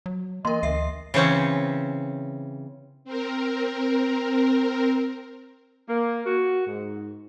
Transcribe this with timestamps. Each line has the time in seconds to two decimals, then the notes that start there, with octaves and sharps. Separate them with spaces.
0.06 F#3
0.45 E3 A#3 A#4 D#5 C6
0.63 D2 E5 C7
1.14 C#3 E3 C4 C#4
3.05 C4 A#4
5.89 A#3
6.26 F#4
6.66 G#2